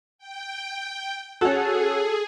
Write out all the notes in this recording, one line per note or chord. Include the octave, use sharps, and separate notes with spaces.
G5
C#4 F#4 G#4 A4